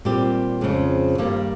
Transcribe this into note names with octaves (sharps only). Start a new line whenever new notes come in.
A#2 G3 C4 G4
F2 C#3 F3 G#3
G2 D#3 G3 A#3